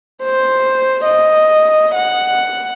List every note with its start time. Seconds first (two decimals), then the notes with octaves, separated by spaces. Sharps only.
0.24 C5
1.05 D#5
1.95 F#5